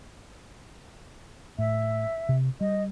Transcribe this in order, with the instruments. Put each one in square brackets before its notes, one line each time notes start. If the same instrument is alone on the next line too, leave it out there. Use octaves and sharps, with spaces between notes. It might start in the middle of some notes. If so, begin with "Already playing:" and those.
[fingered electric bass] A2 [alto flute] E5
[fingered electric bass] C3
[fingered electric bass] G3 [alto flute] D#5